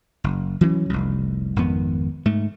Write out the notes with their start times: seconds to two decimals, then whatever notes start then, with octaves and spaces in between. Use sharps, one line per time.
0.24 F#1
0.61 E3 F#3 C4 C#4
0.90 F1 C2
1.56 G#1 F2 D#3 B3
2.25 G#2 A3